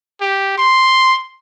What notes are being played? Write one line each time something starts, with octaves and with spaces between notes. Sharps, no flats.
G4
C6